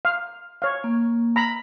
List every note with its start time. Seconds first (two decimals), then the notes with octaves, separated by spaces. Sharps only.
0.05 F5
0.62 C#5 F5
0.84 A#3
1.36 A#5 B5